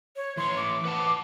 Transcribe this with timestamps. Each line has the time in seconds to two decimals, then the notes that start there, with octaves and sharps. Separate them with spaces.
0.16 C#5
0.37 E3 C#5 C6
0.57 D6
0.85 B4 F#5 A5